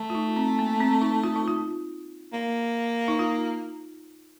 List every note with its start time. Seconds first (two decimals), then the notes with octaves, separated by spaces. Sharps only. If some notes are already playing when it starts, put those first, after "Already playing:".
Already playing: A3
0.10 F4
0.15 D#4
0.36 C4
0.59 A#3
0.80 C4
1.02 D#4
1.24 F4
1.36 D#4
1.48 F4
2.33 A#3
3.08 D#4
3.19 F4